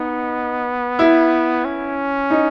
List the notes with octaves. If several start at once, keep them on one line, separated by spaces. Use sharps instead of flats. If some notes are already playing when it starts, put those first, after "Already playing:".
Already playing: B3 D#4
E4
C#4
D#4